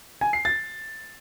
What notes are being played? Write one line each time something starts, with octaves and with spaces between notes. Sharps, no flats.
G#5
C7
A6